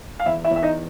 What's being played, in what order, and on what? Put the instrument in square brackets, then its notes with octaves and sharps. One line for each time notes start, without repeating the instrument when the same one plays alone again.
[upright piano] F5
E2 E4 E5
E4 E5
E2
E5
D#4 D#5